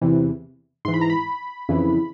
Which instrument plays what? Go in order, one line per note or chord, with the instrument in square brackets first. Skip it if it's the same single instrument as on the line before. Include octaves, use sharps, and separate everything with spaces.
[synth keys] E2 C3 E3
G#2 E3 C6
B5
A#5
B5
F2 C#3 E3